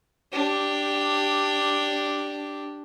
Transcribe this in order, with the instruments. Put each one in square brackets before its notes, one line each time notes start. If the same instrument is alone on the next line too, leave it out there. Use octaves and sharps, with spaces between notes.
[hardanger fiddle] D4 G4